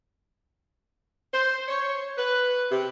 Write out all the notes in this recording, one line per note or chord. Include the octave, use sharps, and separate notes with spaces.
C5
C#5
B4
C3